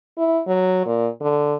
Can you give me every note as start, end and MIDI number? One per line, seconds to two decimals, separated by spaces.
0.17 0.40 64
0.48 0.82 54
0.86 1.08 46
1.21 1.55 50